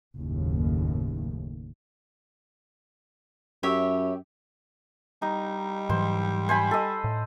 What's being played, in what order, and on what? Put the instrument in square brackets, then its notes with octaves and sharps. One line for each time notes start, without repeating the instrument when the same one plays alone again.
[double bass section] F#1 D#2 A2
[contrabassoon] F#2 [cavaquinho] G4 C#5 E5
[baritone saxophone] G3 [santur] D#4
[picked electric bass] G#2 E3 F#3 [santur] C5
[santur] C5 G#5 B5
A4 D#5
[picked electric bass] A2